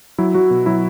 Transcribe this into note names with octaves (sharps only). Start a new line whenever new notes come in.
F#3 E4
F#3 F#4
B2
F#3 E4